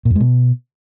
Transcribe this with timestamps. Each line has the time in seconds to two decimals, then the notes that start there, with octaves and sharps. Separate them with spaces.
0.05 A#2
0.10 F2
0.15 G#3
0.20 B2